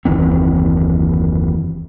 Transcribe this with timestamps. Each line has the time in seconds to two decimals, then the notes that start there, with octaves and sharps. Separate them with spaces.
0.05 F#1 D#2 E3 C4